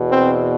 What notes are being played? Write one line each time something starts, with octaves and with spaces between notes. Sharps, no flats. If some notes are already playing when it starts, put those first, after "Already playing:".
Already playing: E2 B2
C4